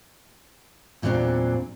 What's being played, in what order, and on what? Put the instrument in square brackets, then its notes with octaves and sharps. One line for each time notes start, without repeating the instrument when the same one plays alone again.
[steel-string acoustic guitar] E2 A#2 C#3 F#3 C4 D4